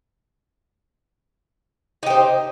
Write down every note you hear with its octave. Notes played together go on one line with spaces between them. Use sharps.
D#4 G4 C5